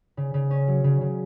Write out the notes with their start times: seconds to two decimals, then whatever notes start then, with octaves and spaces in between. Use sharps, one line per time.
0.17 C#3
0.34 C#3
0.50 C#4
0.68 F#3
0.84 C#3
1.01 C#3